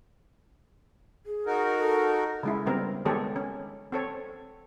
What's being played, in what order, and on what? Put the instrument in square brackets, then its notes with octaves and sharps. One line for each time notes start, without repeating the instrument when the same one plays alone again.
[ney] G#4
[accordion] D#4 F#4 A#4
[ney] A4
[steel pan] C#3 G#3 E4
C#3 G3 B3 C4 A#4
D#3 G#3 B3 G4 A4 C#5
C#4
C4 A4 C#5